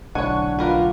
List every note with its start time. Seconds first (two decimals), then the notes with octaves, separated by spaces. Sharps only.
0.15 B1 A2 D3 D4 C#5 F#5 G#5 C#6
0.59 G3 F4 A#4 B4